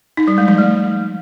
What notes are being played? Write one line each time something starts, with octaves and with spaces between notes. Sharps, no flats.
D#4
G3
G#3
F3
A3